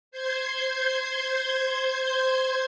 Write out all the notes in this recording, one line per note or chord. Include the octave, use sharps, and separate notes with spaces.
C5 C6 G6 G#6